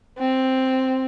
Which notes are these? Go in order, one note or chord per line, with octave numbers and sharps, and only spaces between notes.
C4